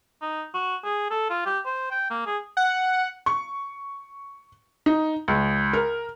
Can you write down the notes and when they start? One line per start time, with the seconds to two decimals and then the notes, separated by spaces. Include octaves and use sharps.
0.22 D#4
0.54 F#4
0.84 G#4
1.10 A4
1.30 F4
1.46 G4
1.65 C5
1.91 G5
2.10 A#3
2.26 G#4
2.57 F#5
3.26 C#6
4.86 D#4
5.28 C#2
5.73 A#4